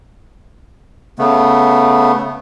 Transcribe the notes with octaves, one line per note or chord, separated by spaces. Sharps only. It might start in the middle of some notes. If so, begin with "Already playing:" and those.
C#3 A3 B3